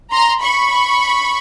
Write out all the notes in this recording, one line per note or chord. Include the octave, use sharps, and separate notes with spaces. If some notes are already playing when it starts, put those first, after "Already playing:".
A#5 C6
B5 C#6